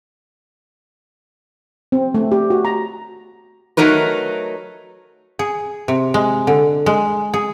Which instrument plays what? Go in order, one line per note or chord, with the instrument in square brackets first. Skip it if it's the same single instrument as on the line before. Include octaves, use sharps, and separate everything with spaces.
[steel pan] C4
A3
G4
F#4
A#5
[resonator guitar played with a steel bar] F#3 A3 D#4 A#4 B4
[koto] G#4
C3
G#3
D3
G#3
G#4